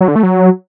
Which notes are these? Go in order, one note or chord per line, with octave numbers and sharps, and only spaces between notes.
F#3
D3
A3
F#3